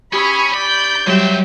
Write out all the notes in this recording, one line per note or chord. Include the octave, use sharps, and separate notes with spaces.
C#4 G4 G#4 B5 C#6 E6
D5 B5 G6
G2 F#3 G3 C4 G4 E5